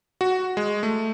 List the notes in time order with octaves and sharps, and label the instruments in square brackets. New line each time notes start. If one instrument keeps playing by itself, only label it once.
[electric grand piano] F#4
G#3
A3